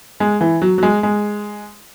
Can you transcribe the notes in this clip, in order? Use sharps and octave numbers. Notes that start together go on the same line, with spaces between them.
G#3
E3
F#3
F#3
G#3
G#3